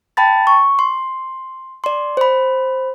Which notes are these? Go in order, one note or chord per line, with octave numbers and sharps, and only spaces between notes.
G5 A5 B5 A6
C#6
C6
D5 C6
C5 B5